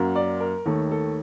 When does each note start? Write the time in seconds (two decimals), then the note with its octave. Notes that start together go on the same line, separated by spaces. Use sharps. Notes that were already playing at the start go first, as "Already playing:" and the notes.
Already playing: F#2 F#3 A#3
0.16 D5
0.41 A#4
0.66 D#2 D#3 A3 A4
0.91 A4